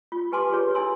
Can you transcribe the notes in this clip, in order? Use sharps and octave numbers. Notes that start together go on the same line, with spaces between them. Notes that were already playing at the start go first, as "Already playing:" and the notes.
F4
G4 B4 G#5 A5 C6 D6
F4 G4 G#4 B4 C#5
D4 E4 A4 G#5 C6 E6